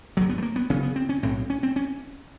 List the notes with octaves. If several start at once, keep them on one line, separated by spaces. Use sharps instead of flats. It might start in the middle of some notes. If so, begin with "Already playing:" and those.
G1 G2 D3 F#3
B3
A3
A#3
B3
F#1 E2 C#3 C#4
B3
C4
C#4
B1 A2 C4
C#4
C4
C#4